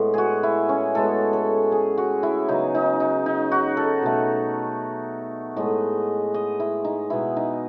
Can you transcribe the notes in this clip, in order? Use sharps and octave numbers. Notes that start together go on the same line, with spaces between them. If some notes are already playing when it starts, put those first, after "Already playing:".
Already playing: A2 G#3 B3
F#4 G#4
E4
C#4
A2 G#3 B3 A4
A4
G#4
F#4
E4
C#3 F#3 B3 D#4
D#4
D#4
D#4
F#4
A4
B2 A3
A2 G#3 B3 D#5
D#5
E4
D#4
B2 G#3 B3 E4
D#4